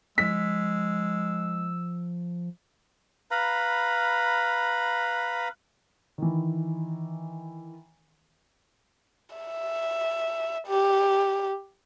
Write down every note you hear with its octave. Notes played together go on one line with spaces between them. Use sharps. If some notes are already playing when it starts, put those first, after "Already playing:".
F3 G#3 E6 B6
B4 F5 A#5 B5
D#3 E3
E5
G4